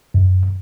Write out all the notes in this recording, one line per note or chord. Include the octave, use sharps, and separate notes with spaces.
F#2